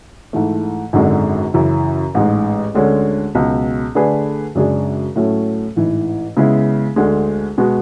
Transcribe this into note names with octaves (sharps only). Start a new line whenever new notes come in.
G#2 E3 A3
G#1 F#2 D3 G#3
F#2 C#3 E3
A1 G#2 G#3
D2 D3 G#3 C#4
C#2 B2 F#3
D3 A3 D4 G#4 B4
F#2 C#3 G#3 D4 G#4
A2 F#3 A3 C#4
A1 G#2 E3
C#3 G#3 B3 E4
D2 D3 G#3
B2 G#3 B3 F#4